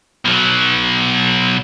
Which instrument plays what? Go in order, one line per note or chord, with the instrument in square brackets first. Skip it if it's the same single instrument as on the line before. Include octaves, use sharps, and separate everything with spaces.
[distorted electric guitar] B1 F#3